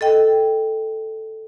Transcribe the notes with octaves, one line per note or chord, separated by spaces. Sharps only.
A4 D#5 G5